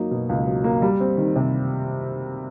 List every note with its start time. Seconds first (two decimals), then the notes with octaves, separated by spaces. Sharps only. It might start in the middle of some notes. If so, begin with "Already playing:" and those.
Already playing: F#3 A#3 D#4
0.11 B2
0.29 C#2
0.47 F#3
0.64 A#3
0.82 G3
1.00 C4
1.17 D#3
1.36 C3